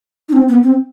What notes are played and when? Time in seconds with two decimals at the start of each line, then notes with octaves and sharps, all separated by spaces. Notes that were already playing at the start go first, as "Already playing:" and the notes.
0.29 D#4
0.33 C4
0.48 B3
0.63 C4